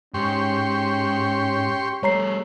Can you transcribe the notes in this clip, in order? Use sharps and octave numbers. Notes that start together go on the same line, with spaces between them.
G#2 C#4 G4 C6 C#6
G3 A3 C#5 A#5 C7